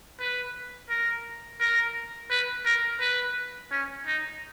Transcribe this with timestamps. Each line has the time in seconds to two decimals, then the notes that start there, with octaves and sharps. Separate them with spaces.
0.20 B4
0.89 A#4
1.60 A#4
2.30 B4
2.65 A#4
3.01 B4
3.71 C#4
4.06 D#4